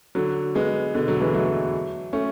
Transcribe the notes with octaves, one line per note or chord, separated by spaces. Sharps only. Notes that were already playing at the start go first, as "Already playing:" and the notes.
D3 F#3
G#3 B3
B2 D3
D3 F#3
E3 G#3
F#3 A3
A3 C#4